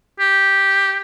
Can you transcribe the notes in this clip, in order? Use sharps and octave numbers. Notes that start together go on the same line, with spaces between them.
G4